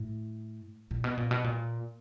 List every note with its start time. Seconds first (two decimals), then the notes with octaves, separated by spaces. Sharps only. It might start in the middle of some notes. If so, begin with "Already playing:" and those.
Already playing: A2
0.91 A#2
1.04 B2
1.17 A#2
1.31 B2
1.44 A#2